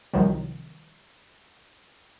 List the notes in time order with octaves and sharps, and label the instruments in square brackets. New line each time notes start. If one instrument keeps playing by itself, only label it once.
[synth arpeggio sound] C2 D#3 F3 F#3